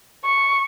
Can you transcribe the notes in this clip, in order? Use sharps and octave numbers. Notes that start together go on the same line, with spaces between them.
C#6